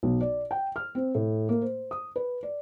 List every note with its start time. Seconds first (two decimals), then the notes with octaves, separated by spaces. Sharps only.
0.03 B1
0.21 D5
0.51 G5
0.76 F6
0.95 C4
1.15 A2
1.49 A#3
1.62 C5
1.91 D#6
2.16 B4
2.43 D5